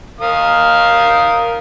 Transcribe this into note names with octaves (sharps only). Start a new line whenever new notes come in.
A#4 F5 D#6